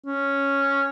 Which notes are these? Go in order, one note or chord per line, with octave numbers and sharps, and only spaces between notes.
C#4